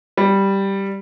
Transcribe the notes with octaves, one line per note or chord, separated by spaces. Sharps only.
G3